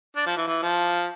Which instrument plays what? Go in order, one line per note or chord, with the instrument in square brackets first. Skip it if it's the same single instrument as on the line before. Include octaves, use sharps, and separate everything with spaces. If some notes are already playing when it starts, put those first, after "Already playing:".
[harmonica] D4
F3
E3
E3
F3